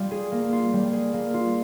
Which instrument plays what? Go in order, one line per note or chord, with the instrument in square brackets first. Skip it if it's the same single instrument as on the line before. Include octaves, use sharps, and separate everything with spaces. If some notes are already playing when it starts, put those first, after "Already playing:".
Already playing: [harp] G3 F4
G#4
A#3
F4
G3
G#4
A#3
F4